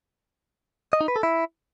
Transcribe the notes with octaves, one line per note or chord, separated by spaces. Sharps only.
D#5
D#4
B4
A4
E4